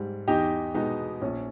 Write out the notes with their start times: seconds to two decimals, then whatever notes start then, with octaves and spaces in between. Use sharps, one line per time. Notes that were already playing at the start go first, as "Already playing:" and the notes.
Already playing: G#2 G3
0.28 E2 D#4 G4
0.75 B2 G#3 B3 D#4
1.22 A#1 C#4